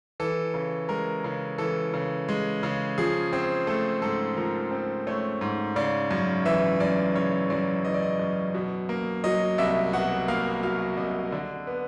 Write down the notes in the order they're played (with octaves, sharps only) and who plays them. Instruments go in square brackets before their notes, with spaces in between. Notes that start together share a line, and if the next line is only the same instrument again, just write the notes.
[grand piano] E3 A4
C#3
G#3 A#4
C#3
E3 A4
C#3
G#3
C#3
F3 G#4
C4
A3 A4
G#2 A4
F3 A#4
C4
A3 C#5
G#2
C#3 D5
F#2
E3 E5
F#2 D5
C#3 C#5
F#2 D5
E3 D#5
D5
D#5
F#2
B2
A#3
F#3 D#5
C2 E5
B2 F#5
A#3 F5
F#3 F5
C2 D#5
D3
B3